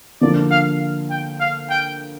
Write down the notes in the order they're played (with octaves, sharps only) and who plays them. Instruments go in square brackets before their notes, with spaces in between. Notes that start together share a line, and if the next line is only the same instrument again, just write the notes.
[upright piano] D3 F3 A#3 D4 [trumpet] D5
[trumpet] F5
G5
F5
G5